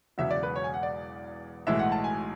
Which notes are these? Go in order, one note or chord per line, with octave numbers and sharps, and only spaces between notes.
E1 E2 C#3 F#3 E5
D5
B4
C#5
G#5
F#5
D5
B1 A2 E3 G#3 E5
F#5
A5
G#5